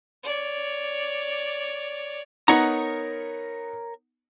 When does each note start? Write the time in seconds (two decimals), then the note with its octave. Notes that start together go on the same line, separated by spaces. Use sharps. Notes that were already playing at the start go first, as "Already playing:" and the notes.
0.23 C#5 D5
2.48 B3 D#4 A#4 C#5 F#5 A#5